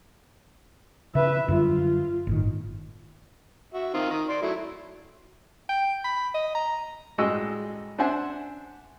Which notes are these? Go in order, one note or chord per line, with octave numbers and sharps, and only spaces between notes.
C#3 B4 E5
F#2 D3 G3 F4
G1 A2 D#3
F#4 E5
D#3 C4 F4
D#3
D5 C6
F#3 A3 E4
G5
B5
D#5
A#5
A1 G3 G#3 F#4 D#5 E6
D4 C5 E5 F#5 G#5 C6